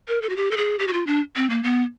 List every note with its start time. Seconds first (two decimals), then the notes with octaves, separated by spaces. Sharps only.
0.08 A#4
0.22 A4
0.29 F#4
0.36 G4
0.51 A4
0.57 G#4
0.79 G4
0.88 F#4
0.93 F4
1.07 D4
1.36 C4
1.50 A#3
1.63 B3